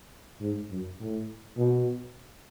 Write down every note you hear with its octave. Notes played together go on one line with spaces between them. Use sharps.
G#2
F#2
A2
B2